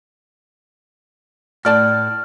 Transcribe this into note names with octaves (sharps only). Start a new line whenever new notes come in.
A2 D5 A5 F6